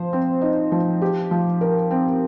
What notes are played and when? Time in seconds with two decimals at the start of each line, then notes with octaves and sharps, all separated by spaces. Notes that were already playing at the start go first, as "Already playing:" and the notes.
Already playing: F3 C5
0.13 C4
0.42 D#4
0.72 F3
1.02 G4
1.31 F3
1.61 A#4
1.91 C4